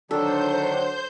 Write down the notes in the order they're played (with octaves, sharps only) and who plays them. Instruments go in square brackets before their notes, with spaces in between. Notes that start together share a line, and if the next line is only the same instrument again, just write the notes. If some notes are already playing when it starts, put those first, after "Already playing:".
[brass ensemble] D3 F#3 [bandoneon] D#3 D4 [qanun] A4 [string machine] C5 G6